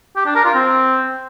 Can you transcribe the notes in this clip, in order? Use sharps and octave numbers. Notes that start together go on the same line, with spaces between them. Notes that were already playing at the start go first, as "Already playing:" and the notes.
G4
D4
A#4
F4
C4